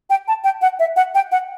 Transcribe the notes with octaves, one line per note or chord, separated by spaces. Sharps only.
G5
A5
G5
F#5
E5
F#5
G5
F#5